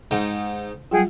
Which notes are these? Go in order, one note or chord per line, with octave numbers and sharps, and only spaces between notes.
G#2 D#4 G5
F#3 G3 F4 G#4 F#5 G5